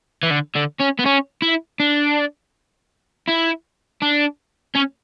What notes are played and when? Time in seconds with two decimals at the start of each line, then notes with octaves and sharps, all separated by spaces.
0.23 E3
0.31 D3
0.56 D3
0.80 C#4
0.99 B3
1.06 C#4
1.42 E4
1.80 D4
3.28 E4
4.02 D4
4.76 C#4